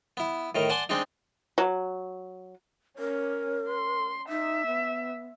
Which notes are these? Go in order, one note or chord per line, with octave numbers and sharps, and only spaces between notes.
B3 E4
A2 D#3 A#4
D5 F#5 G#5 A5 C6
G#3 C4 D4 D#4
F#3
C#4 A#4
C6
D#4 E5
B3